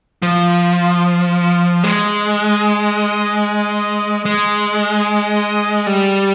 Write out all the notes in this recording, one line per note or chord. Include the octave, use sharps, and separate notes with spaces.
F3
G#3
G#3
G3